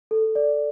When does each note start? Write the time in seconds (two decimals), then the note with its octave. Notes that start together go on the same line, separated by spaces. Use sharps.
0.11 A4
0.35 D5